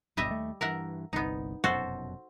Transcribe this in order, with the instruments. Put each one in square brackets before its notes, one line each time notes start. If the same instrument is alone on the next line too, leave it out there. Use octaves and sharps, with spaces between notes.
[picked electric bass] D1 G1 B2 [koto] G3 D#5 E5
[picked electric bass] D#2 A3
[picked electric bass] G2 E3 [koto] A#4 E5 F#5
[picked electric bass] G1 C2 [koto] B3 D#4
[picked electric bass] F1 F#2 B2 [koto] F#4 A4 C5